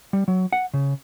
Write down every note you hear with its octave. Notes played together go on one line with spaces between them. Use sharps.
G3
F#3
F#5
C#3